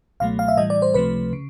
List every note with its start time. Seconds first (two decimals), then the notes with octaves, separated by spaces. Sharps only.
0.20 C#2 B2 F#3 A3 F5
0.39 F5
0.48 E5
0.57 A2 E3 G3 D#5
0.70 D5
0.82 C5
0.94 C#2 C3 F3 A3 B4
1.33 C#3